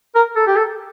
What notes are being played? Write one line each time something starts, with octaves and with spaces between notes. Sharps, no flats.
A#4
A4
G4
A4